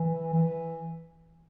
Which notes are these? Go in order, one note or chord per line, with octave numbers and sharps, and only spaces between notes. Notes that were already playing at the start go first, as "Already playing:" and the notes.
Already playing: E3
E3